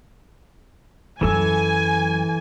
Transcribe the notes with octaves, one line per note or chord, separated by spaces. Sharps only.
F#2 E3 F#3 A4 G#5 E6